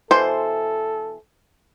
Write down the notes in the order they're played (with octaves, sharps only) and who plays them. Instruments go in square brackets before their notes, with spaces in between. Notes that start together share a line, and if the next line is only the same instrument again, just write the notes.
[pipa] B2 E3 C6 [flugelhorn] A4 [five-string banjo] C5